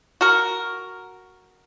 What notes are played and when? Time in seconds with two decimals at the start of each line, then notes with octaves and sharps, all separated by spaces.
0.21 F#4 A#4